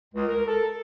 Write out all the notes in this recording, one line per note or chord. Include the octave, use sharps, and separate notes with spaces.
C#2
A#4
A4